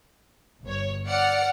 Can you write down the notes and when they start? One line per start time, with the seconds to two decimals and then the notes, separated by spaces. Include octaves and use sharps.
0.63 G1 C#5
1.06 D5 F#5 F6 C#7